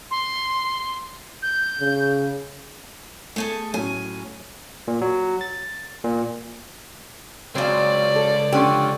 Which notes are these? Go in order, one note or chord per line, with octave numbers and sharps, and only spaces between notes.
C6
G6
C#3
A3 G#4 A4
A2 F#3 C#4 G#5
A#2
F#3
A6
A#2
C#2 C#3 F#3 C4 D5
A4
D3 F3 C#4 G4